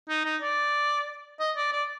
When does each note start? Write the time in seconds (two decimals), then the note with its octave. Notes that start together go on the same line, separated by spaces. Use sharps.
0.09 D#4
0.25 D#4
0.42 D5
1.40 D#5
1.56 D5
1.72 D5